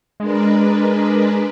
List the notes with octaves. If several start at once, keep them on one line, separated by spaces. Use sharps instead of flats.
G#3 D4 A#4 B4